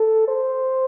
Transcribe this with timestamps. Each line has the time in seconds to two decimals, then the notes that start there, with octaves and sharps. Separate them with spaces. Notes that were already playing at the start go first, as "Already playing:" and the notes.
Already playing: A4
0.27 C5